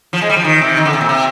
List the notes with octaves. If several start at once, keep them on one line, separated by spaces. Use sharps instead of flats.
F3
G#3
G3
F3
D#3
C3
D#3
D3
C3
A#2
C3